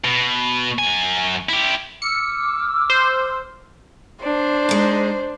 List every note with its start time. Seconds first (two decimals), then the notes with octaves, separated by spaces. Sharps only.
0.05 B2
0.79 F#2 G#5
1.49 E4 G4
2.02 D6 E6 F6 C#7
2.90 C5
4.24 D4 C5
4.69 G#3 D#4